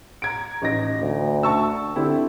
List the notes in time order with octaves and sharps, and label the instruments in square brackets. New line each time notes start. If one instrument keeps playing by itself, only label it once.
[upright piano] A#5 G#6 D7
A1 D#4 A#6
[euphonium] D2
[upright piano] A5 C#6 E6
[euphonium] D3 [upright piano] C4 E4 G4